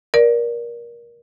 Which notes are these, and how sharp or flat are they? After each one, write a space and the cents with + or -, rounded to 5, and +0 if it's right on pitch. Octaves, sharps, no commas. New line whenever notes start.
A#4 +20 D5 +0